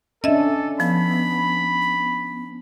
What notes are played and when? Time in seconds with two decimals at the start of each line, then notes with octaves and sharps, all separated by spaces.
0.24 C#4 D4 A4 D#5 E5
0.80 F3 B3 B5
1.82 B3